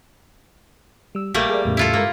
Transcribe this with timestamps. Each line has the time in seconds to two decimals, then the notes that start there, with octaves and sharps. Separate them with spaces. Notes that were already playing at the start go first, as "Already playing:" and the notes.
1.15 G3 E6
1.34 A#1 G3 A3 A#3
1.50 G#4 A#4 D5
1.65 E2 A2 C#3
1.77 E4 F4 A4
1.93 G2 G#3 A#3 A#4